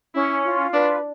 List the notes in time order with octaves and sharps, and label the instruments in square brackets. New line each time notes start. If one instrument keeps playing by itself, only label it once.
[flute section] C#4 [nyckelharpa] E4
[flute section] F4
[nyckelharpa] D4 [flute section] B4